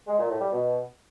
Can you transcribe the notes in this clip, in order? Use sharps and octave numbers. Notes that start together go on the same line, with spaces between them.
G#3
A#2
A2
G3
B2